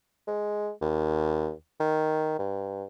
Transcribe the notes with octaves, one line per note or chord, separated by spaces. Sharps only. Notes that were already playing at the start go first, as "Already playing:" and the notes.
G#3
D#2
D#3
G2